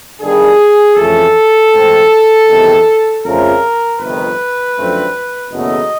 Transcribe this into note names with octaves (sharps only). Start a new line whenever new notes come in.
G1 G2 D#3 G3 G#4
F2 C#3 E3 A3 C#4 A4
G#2 E3 A3 C4
E2 C3 D#3 G3
F2 C#3 F3 A3 A#4
G1 F2 C3 D#3 B4
F#2 D3 F3 A3 C4
F#1 E2 B2 F#3 A3 D#5